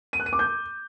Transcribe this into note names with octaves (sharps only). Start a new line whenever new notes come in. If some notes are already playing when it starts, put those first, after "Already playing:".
D#7
F#6
D#7
D6
G6